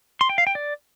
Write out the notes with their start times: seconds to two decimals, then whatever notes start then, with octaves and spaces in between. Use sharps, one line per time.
0.21 C6
0.29 G5
0.38 F5
0.47 G5
0.55 D5